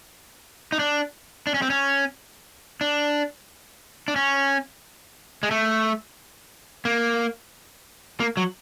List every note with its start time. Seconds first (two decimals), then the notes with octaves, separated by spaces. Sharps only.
0.72 D#4
0.79 D4
1.47 D4
1.54 C#4
1.62 C4
1.70 C#4
2.81 D4
4.08 D4
4.16 C#4
5.43 G#3
5.51 A3
6.85 A#3
8.20 A#3
8.37 F#3